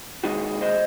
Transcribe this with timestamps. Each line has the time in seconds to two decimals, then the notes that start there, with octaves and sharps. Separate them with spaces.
0.24 C3 D#3 G#3 D#4 F#4
0.61 C5 D#5